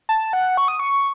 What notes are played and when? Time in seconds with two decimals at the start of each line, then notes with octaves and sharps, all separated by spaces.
0.09 A5
0.33 F#5
0.57 C#6
0.68 D#6
0.80 C#6